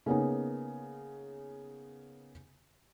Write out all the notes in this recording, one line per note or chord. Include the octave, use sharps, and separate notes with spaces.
C#3 A#3 B3 C#4 D#4